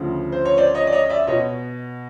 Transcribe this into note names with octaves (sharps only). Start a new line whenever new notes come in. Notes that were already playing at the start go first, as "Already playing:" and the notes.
Already playing: D2 C#3 F3
C5
C#5
C5 D5
C#5 D#5
D5
C#5 D#5
D5 E5
B2 C#5 D#5